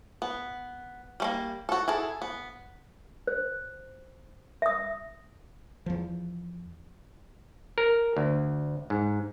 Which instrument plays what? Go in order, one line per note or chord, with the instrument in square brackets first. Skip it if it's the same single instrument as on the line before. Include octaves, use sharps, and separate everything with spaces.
[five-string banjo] B3
G3 A3 A#3
F#4 A4
E4 G#4 A4
B3
[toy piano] C5
E5 D#6
[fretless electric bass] E2 F3
[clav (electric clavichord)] A#4
D2
G#2